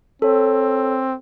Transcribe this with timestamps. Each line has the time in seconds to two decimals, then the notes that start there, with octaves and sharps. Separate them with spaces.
0.22 C4 A4 C#5